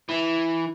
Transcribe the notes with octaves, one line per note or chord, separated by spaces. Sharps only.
E3